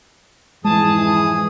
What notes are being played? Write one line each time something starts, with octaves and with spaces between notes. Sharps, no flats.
F2 G#2 E3 G#3 G#4 A5 D#6